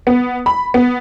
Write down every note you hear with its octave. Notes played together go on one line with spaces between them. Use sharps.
B3
B5
B3